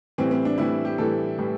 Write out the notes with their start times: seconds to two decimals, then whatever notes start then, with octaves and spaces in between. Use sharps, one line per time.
0.18 A2 E3 G3 C4
0.31 C4
0.45 D4
0.58 A2 E3 G3 E4
0.85 G4
0.98 A2 E3 G3 A4
1.38 A2 E3 G3